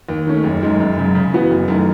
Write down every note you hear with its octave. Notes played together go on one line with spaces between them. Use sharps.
D#2
D#3 A3 C#4
F#1
F#2 D#3 G#3
F#1
F#2 C#3
C#3
E3 B3 F#4
F#1
F#2 D#3 A3